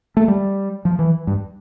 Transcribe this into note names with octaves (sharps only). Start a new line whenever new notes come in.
A3
G3
F3
E3
G2